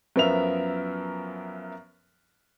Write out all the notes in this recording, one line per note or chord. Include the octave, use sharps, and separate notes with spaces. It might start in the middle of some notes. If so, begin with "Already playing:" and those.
F#2 F3 B3 A#4 E5 F7